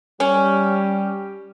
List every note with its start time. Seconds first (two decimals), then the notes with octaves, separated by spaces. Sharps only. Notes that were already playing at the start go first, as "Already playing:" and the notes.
0.20 G3 C#4 G4